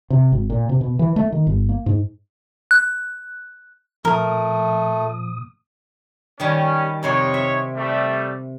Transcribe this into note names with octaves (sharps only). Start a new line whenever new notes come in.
C3
G#1
A#2
C3
B2
E3
A3
D#3
G1
A#3
G#2
F#6
A#2 F3 A3 A#4 D#6
D#3 G3 C#4
F2 C3 C#4 D#4 C5 C#5
E5
G3 A3